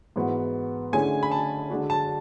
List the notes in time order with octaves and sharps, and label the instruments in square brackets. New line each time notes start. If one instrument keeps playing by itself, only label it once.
[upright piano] G#2 E3 B3 F#4
[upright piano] D3 A3 C#4 E4 G#4 [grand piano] G#5
[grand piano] B5
A5
[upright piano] D3 G#3 D4 F#4
[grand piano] A5